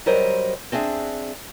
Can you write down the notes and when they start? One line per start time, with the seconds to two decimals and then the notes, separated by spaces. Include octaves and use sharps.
0.06 F#3 G3 A#4 C5 D#5
0.72 C4 D4 G#4 E5